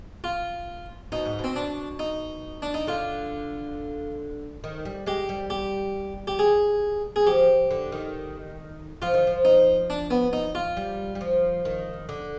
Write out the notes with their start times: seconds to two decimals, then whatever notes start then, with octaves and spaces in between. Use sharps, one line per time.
0.24 F4
1.12 B2 D#4
1.25 G#2
1.39 B2
1.44 C4
1.56 D4
1.99 D#4
2.62 D4
2.74 D#4
2.87 D3 F4
4.64 D#3
4.85 G3
5.06 G#3 G4
5.29 G3
5.50 G4
6.27 G4
6.39 G#4
7.16 G#4
7.26 F3 G4
7.71 D3
7.92 D#3
9.02 F3 F4
9.14 D#3
9.27 F3
9.45 D#4
9.90 D4
10.11 B3
10.33 D#4
10.55 F4
10.77 G3
11.15 G3
11.21 F3
11.65 D#3
12.09 D3